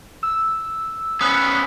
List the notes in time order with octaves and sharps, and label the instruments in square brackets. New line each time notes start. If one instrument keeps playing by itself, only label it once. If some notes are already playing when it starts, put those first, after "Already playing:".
[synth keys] E6
[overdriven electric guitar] B3 C#4 [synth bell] D#6 F#6